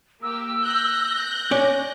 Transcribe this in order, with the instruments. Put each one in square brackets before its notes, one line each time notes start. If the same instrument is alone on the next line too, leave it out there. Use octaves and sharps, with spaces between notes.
[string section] A#3 G4 [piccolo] E6
[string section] F#6 G6 A#6
[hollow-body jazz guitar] C#4 D5